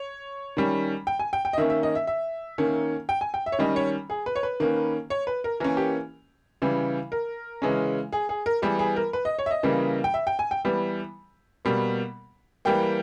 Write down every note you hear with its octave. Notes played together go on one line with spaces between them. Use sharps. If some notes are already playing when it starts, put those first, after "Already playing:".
Already playing: C#5
D#3 G3 C#4
G5
G#5
G5
G5
D#5
D#3 A#3 C#4 E5
E5
D#5
E5
E5
D#3 A#3 C#4
G5
G#5
G5
E5
C#5
D#3 G3 C#4 D#5
C#5
G#4
B4
C#5
B4
D#3 A#3 C#4
C#5
B4
A#4
E3 A#3 C#4 A#4
G4
C#3 E3 G3
A#4
C#3 E3 G#3 C#4
G#4
G#4
A#4
E3 G3 B3 G#4
G#4
A#4
B4
D#5
C#5
E5
D#5
C#3 E3 G3 A#3
G5
E5
G5
G#5
G5
E3 G3 B3
B2 G3 A#3
E3 G3 A#3 G5